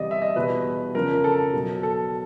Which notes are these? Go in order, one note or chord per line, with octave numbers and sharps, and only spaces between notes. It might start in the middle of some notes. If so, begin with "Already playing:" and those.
Already playing: E2 C3 E3 G3 D5 D#5
E5
D#5
E2 B2 G3 B4
F2 C#3 F3 A#4
A4
B2 F#3
A4